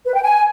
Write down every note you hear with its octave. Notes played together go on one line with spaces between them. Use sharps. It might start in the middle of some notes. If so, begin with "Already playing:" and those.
B4
G5
G#5